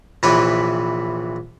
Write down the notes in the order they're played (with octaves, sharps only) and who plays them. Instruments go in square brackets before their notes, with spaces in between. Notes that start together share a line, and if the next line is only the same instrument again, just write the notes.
[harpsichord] A#1 C3 E3 E4 B4 C#5